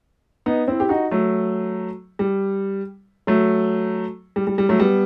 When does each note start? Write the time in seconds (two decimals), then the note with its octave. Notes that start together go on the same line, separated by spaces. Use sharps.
0.46 B3 D#4
0.68 C4 E4
0.80 G4
0.89 D#4 F#4
1.11 F#3 A3
2.19 G3
3.27 F#3 A3
4.36 G3
4.47 G3
4.58 G3
4.69 F#3 A3
4.79 G3 B3